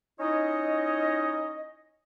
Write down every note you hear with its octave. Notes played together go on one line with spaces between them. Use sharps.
C#4 D#4 E4 C#5 D#5